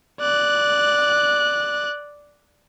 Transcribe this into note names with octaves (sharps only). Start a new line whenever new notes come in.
D5 F#6